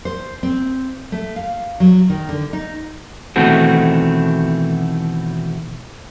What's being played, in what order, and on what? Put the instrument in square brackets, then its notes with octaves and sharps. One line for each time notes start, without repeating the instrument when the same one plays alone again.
[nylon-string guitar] C5
C4
A3
F5
F#3
D#3
D3
D#4
[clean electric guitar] B2 D#3 E3 A3 C4 F#4